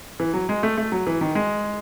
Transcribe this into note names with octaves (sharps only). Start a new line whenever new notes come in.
E3
F#3
G#3
A3
A3
F#3
E3
D#3
G#3